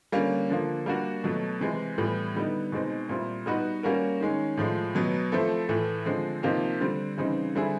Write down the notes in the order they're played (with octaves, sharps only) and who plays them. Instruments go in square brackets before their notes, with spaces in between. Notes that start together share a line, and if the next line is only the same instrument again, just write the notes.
[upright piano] D3 G3 A#3 C#4
D3 F3 A#3
G3 A#3 D4 F#4
B2 F#3 A3
C3 E3 G#3
A2 E3 G3 B3
D3 G3 B3 D#4
B2 G#3 C4 D#4
A#2 G3 C4 E4
G3 B3 D#4 F#4 B4
G3 A#3 C#4 F#4 A#4
D#3 G#3 C#4
A2 F3 G#3
B2 F#3 B3
F3 A3 C4 E4 A4
A2 E3 A3
D3 F3 G#3 C4
C3 F3 A#3 D#4 G4
D3 G3 C4
C#3 E3 G3 C4 D#4
D3 G3 C4 E4 G#4